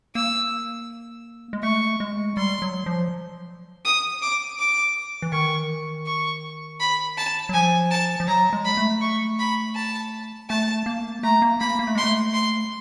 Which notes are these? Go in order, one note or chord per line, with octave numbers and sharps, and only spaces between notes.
A#3 E6
G#3
A3 C#6
G#3
G3 C6
F#3
F3
D#6
D6
D6
E3
D#3 C#6
C#6
B5
A5
F#3
F3 G#5
A5
F3
F#3 A#5
G#3
B5
A3
C#6
B5
A5
A3 A5
A#3
A3 A#5
A#3
A#3 B5
A#3
A3
G#3 C6
A3
C6